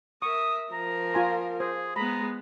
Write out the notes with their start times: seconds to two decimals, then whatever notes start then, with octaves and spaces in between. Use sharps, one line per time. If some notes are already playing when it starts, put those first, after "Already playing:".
0.22 A#4 E5 C#6 D#6
0.73 F3 A#4 A#5
1.14 F4 G#5 C6
1.60 G#4 C5
1.96 G#3 B3 A#5 B5